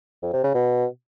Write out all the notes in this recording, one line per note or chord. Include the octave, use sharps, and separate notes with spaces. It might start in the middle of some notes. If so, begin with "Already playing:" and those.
F2
C3
C#3
B2